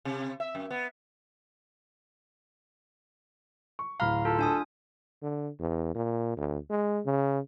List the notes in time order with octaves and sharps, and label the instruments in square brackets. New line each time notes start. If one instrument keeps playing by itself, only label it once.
[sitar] C3
E5
F#2
B3
[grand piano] C#6
[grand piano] D1 B5 F6 [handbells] F5 A#5
[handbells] F4 [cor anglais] A4
[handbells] D4 G#5 D#6
[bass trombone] D3
E2
A#2
D2
G#3
C#3